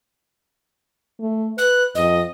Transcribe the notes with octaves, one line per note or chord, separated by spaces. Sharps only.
A3
B4 F#6
F2 D#5